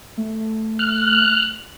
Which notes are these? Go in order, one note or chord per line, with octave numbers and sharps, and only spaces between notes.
A3
F6 F#6